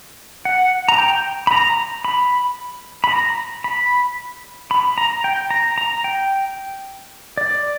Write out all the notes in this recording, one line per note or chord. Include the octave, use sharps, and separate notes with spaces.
F#5
A#5
G5
B5
A#5
B5
B5
A#5
B5
B5
A#5
G5
A#5
A#5
G5
D5